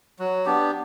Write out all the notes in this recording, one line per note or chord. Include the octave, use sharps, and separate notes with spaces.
F#3
B3 D4 G4